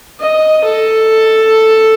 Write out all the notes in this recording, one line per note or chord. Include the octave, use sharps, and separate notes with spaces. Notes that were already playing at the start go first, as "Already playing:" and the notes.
D#5
A4